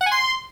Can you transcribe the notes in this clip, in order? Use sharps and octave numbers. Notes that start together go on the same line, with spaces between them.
F#5
G#5
C6